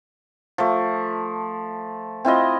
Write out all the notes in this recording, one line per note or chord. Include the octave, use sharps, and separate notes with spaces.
F3 A3
C4 E4 F4 D#5